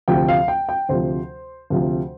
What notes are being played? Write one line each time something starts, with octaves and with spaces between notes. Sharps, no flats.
D2 C3 F3 G5
F5
G5
G5
D2 C3 F3 C5
D2 C3 F3